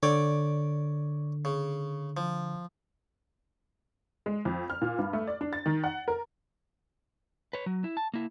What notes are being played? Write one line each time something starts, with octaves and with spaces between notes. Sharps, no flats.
D3 C#5 D5 G5
C#3
F3
G#3
F2
F6
A#2
G2
A3
D5
D4
A6
D#3
F#5
A#4
B4 C#5
F#3
E4
A5
A#3 E4